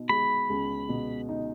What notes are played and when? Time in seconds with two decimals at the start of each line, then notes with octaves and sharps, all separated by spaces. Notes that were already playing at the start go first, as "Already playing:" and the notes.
Already playing: B2 D#4
0.09 G#3 B5
0.50 C#2
0.89 B2
1.29 D#4